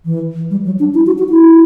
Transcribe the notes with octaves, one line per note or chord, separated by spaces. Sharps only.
E3
G3
F#3
D4
E4
F#4
F#4
E4